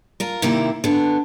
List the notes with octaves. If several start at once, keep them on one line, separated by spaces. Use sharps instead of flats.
F4 A#4
C3 D#3 A#3 E4
D3 B3